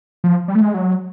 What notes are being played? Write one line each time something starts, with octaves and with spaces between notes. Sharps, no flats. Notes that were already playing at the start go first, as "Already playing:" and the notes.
F3
G3
A3
G#3
F#3